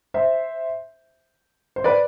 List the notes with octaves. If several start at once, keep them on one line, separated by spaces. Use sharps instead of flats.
C5 E5
C5
B4 D5